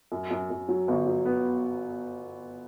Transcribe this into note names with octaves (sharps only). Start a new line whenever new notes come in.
F#2
F#2
F#2
F#3
G1
F#3
B3